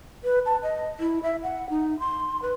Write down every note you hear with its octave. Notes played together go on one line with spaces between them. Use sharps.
B4
A5
D#5
E4
E5
F#5
D#4
C6
B4